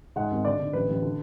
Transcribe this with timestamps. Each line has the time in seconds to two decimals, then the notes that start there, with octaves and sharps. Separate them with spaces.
0.16 G#2 F#5
0.31 G#1
0.45 D3 D5
0.59 D3
0.73 A1 B4
0.89 A1
1.02 D3